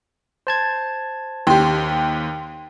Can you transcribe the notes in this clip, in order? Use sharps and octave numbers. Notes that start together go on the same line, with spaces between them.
C5 A5 G#6
D#2 G4 G5 C6